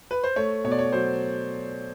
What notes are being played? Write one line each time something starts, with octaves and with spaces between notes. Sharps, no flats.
B4
C5
A3 C#5
B2 C#5
D5
C#5
F#3 C5